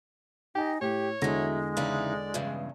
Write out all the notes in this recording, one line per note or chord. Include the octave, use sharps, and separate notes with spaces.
D#4 G4 G5 G#5
A2 G4 C#5
E2 D3 F#3 G#3 A3 A#6
C#3 E3 D#4 D5
E2 G2 C#3